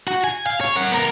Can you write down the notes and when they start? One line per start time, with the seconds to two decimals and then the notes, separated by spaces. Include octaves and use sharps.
0.08 F#4
0.24 G#5
0.47 F5
0.61 C#5
0.76 A#4 F#5
0.91 B3 A#4